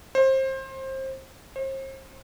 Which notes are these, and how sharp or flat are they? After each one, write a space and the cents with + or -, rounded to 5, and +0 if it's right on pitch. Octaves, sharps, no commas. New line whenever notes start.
C5 +25
C5 +40